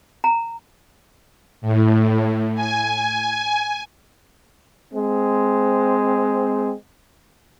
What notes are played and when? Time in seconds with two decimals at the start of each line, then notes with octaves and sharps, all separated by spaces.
0.24 A#5
1.61 A2
2.55 G#5
4.93 G#3 C4